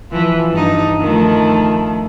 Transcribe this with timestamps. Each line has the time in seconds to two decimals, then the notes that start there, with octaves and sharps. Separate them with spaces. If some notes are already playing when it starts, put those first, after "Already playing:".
0.11 E3 F3
0.52 G2 D#4
1.01 D#3 F3 A3